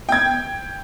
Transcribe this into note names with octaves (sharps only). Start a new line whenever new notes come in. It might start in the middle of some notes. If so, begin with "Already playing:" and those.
G5 G#6